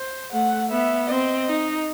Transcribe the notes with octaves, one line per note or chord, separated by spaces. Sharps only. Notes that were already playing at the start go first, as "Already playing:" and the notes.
Already playing: C5
A3 F#5
B3 E5
C4 D#5
D#4